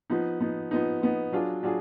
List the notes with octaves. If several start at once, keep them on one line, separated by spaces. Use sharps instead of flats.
F3 B3 D#4
F3 B3 D#4
F3 B3 D#4
F3 B3 D#4
F#3 D4 F4 G#4
F#3 D4 F4 G#4